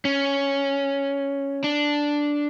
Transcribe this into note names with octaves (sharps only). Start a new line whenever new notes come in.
C#4
D4